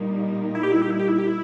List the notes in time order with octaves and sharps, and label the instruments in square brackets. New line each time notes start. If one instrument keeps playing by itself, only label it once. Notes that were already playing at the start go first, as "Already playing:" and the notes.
Already playing: [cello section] A#2 G3 A#3 D#4
[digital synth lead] E4
G4
E4
G4
E4
G4
E4
G4
E4